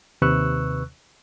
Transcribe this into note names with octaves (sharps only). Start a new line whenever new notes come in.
D#2 C3 B4 C#6 E6 F#6